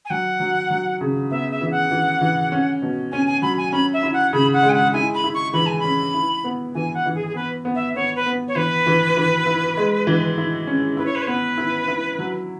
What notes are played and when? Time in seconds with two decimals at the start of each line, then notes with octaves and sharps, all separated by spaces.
0.05 G#5
0.10 F#3 F#5
0.40 F#3
0.70 F#3
1.01 C#3
1.31 B3 E5
1.51 E5
1.61 E3
1.71 F#5
1.91 E3
2.21 E3
2.52 C#4
2.82 B2
3.12 C#4 G#5
3.27 G#5
3.42 F#3 B5
3.58 G#5
3.72 C#4 B5
3.93 E5
4.03 E4
4.14 F#5
4.33 C#3 B5
4.54 F#5
4.63 G#3
4.69 G#5
4.74 F#5
4.93 E4 G#5
5.14 B5
5.24 E4
5.34 C#6
5.53 E3 B5
5.66 G#5
5.79 C#4 B5
6.14 E4
6.44 B3
6.75 E3 G#5
6.94 F#5
7.06 E3
7.15 G#4
7.27 G#4
7.35 B3 B4
7.65 B3
7.75 E5
7.95 B3 C#5
8.16 B4
8.26 B3
8.48 C#5
8.55 E3 B4
8.86 E3
9.17 E3
9.46 E4
9.77 G#3
10.07 E3
10.38 E4
10.67 C#4
10.97 E4 B4
11.06 C#5
11.15 B4
11.22 C#5
11.27 B3 B4
11.58 E4
11.88 E4
12.19 F#3